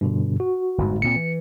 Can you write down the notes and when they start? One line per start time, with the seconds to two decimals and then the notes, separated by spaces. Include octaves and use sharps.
0.01 G2 B2 D3
0.40 F#4
0.78 G1 F2 G#2
1.02 D2 A#2 C4 C#7
1.16 E3